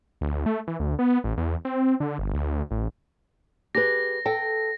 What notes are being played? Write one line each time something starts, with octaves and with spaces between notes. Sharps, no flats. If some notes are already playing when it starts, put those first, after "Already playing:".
D2
A3
E3
D2
B3
A1
E2
C4
D3
G1
D2
A1
G4 G#4 B4 A#6
A4 G5